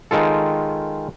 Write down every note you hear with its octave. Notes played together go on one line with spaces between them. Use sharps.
D#3 G#3 F4 A4